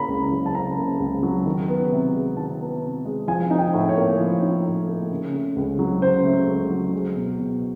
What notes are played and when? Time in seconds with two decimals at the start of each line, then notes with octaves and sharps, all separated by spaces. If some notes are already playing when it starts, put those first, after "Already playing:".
Already playing: C#3 A#3 A#5 B5
0.08 C#2
0.23 A#5
0.32 F#3
0.46 A5
0.54 C#3 A#5
0.77 A#3
1.00 C#2
1.23 F#3
1.46 D#3
1.68 B3
1.92 C3
2.14 G#3
2.37 D#3 A5
2.59 B3
2.82 C3
3.05 G#3
3.28 F3 G#5
3.51 D#4
3.58 G5
3.74 A2
3.89 C#5
3.97 A#3
4.20 F3
4.42 D#4
4.66 A2
4.88 A#3
5.10 C#3
5.34 A3
5.56 C#2
5.79 F#3
6.01 C#3 C5
6.25 A3
6.47 C#2
6.70 F#3
6.93 G#3
7.16 B2
7.38 B2